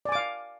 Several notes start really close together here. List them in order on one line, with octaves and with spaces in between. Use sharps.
D5 G#5 D6 F5